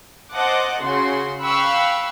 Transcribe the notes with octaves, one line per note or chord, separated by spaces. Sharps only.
C5 D#5 F#5 A5 D6
C#3 F#4 C6
F5 G5 B5 C#6 E6 F#6